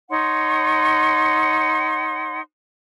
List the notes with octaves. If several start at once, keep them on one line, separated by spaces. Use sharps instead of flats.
D#4 C#5 F#5 C6